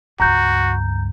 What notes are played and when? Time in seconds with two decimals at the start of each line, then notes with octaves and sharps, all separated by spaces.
0.20 C#2 G2 F#4 A#5 G6